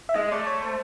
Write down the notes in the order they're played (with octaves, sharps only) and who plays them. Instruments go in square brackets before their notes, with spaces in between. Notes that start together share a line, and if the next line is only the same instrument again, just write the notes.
[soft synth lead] E5
[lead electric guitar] G#3 [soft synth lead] D#5
[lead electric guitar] A3 [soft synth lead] D5
[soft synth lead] C#5
C5